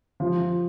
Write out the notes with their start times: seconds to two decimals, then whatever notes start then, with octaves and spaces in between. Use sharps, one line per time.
0.20 F3